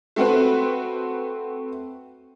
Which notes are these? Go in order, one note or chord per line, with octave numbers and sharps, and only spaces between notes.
A3 C4 F#4 B4